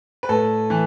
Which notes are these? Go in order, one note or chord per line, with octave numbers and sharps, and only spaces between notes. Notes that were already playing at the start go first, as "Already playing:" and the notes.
B4
A2 A4
E3